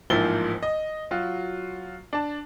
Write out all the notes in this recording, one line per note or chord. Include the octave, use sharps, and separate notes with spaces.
A1 G#2 F3 A#3 E4 G7
D#5
F#3 F4 F#4
D4 A5